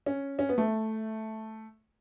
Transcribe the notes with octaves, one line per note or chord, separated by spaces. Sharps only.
C#4
C#4
B3
A3